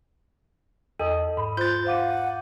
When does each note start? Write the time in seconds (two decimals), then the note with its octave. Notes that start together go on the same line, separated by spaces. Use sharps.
0.99 E2 A4 D#5 D#6
1.37 G#2 B5
1.57 F4 C5 C6 F#6 G6 A6
1.87 F5 F#5 D6 D#7